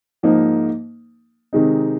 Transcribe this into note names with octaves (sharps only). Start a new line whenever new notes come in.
G#2 F3 A#3 D#4
C3 D#3 G#3 D#4